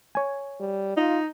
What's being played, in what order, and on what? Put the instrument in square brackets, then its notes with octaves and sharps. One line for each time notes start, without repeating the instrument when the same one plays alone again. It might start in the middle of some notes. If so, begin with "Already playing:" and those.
[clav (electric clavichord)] C#5 G#5
[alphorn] G3
[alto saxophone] D#4 [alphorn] F4